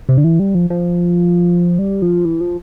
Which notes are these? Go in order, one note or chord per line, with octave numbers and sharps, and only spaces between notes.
C3
D3
E3
G3
F3
F3
G3
F3
E3
F3